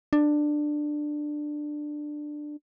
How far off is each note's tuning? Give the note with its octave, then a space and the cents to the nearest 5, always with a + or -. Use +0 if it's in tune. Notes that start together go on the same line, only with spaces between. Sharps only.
D4 +15